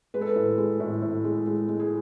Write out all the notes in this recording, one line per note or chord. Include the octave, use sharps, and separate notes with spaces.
G#3 B4
A4
B4
A2
G#3
A2
A2
G#3
G#3
G#3
G#4